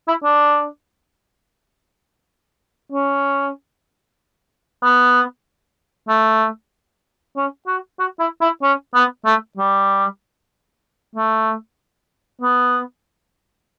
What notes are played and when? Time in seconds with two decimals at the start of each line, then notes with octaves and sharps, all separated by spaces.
0.08 E4
0.24 D4
2.93 C#4
4.83 B3
6.09 A3
7.37 C#4
7.67 F#4
8.00 F#4
8.20 E4
8.41 E4
8.63 C#4
8.95 B3
9.25 A3
9.58 G3
11.16 A3
12.41 B3